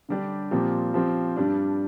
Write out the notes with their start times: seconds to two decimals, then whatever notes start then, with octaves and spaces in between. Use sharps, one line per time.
0.09 D3 G3 D4 G4
0.51 A#2 F3 C4 G4
0.94 F3 C4 G4
1.36 G2 G3 D4